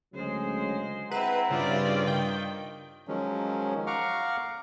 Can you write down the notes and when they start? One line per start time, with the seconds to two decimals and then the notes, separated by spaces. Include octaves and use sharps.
0.14 D2 C#3 F#3 G#3 C5
1.11 C4 E4 G#4 B4 F#5 A#5
1.50 G2 C#3 F4 D5
2.07 D#3 G5
3.08 D#3 F3 F#3 G#3 C#4
3.87 F5 F#5 A#5 C#6 D6 F6